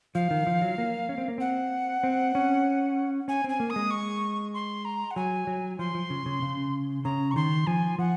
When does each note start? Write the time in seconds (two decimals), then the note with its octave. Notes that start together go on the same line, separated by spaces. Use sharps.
0.15 F3 F5
0.31 D#3
0.47 F3
0.62 F#3
0.78 A#3
1.09 C#4
1.18 C4
1.28 A#3
1.38 C4 F#5
2.03 C4
2.35 C#4
3.28 C#4 G#5
3.44 C4 G#5
3.60 A#3
3.70 D#6
3.76 G#3
3.91 C#6
4.54 C6
4.85 A#5
5.11 F#5
5.16 F#3 G#5
5.47 F#3
5.79 F3 C6
5.95 F3
6.10 C#3
6.26 C#3
6.42 C#3
7.05 C#3 A#5
7.31 C#6
7.36 D#3 C6
7.67 F3 G#5
7.98 F3 F#5